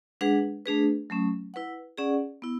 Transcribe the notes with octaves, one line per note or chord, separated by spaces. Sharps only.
G#3 D4 G#4 B4 F#5
A3 D4 G#4 B4
F#3 A3 C#4
E4 B4 F#5
C#4 G#4 D5 F#5
B3 E4